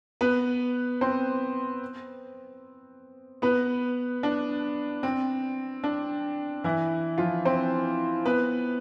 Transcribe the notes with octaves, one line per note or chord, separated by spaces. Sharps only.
B3 B4
C4 C5
B3 B4
D4
C4
D4
E3 E4
F3 F4
C4 C5
B3 B4